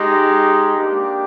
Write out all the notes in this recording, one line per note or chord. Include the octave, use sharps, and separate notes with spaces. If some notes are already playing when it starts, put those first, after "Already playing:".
Already playing: G#3 D#4 G4
A#3 D4 G4